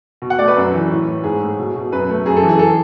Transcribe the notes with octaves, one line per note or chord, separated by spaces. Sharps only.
B2
F#5
A3 D5
B4
F#2
E3
A2
A2
G#2 G#4
A3
B2
B2
F#2 B4
A3
F#2 G#4
A4
E3
G#4
A4